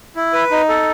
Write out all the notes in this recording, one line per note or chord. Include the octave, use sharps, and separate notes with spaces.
E4
B4
D#4
A4